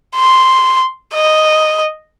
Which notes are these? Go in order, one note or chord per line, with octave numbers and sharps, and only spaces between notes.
C6
D#5